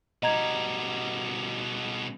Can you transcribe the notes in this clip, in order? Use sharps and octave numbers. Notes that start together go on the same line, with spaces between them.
B2 G3 D#5 A#5 G#6